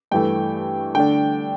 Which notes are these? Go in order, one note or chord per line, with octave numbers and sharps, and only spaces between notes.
G2 E3 A3 G5
D3 A3 D4 G5